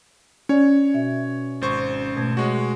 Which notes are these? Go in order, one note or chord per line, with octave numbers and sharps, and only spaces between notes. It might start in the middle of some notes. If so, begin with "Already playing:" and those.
C#4 C#5 D5
B2 F#4 E5
G#1 C5 C#6
B2 A3 G#6
G#3 F#4 C#5 C#6